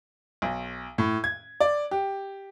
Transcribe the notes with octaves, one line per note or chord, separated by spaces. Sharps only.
B1
A2
G#6
D5
G4